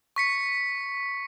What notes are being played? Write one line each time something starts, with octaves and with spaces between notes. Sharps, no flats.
C#6 B6 C#7